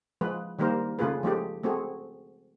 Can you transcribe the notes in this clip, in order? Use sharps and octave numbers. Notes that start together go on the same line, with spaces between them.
F3 G#3 B4
D#3 G3 A#3 A#4 C5
C#3 A3 F4 G#4 B4
F3 G#3 A3 G4
A3 C4 F#4 G#4